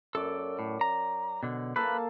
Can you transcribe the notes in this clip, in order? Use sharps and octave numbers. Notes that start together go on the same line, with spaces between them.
F#2 A4 D5
A2
A#5
B2 D3
A#3 A4 B4 F5